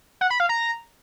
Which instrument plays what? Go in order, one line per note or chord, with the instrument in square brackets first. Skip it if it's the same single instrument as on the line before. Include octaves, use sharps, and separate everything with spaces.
[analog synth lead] F#5
B5
F5
A#5